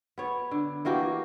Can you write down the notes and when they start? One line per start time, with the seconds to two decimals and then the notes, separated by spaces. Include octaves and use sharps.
0.18 B3 C#5
0.51 D3
0.85 E3 A#3 F#4 G4